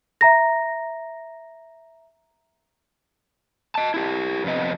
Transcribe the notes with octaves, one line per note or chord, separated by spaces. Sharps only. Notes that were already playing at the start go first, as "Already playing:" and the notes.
E5 A#5 A#6
D#5 A5
E4 G4
F2 C3 B3 D#5